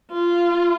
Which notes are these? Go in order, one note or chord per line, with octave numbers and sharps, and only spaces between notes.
F4